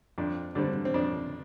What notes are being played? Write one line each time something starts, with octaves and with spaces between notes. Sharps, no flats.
F2 D4
D3 G3 C4 D4
C4
F2 D4